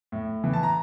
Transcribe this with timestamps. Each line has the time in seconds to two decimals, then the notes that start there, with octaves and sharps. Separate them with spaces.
0.12 A2
0.44 E3
0.53 A5
0.63 A#5